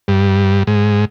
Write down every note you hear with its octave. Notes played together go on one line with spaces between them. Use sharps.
G2
G#2